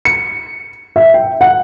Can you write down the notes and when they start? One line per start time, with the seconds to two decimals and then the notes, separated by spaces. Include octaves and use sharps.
0.05 C#7
0.96 E5
1.14 G5
1.41 F#5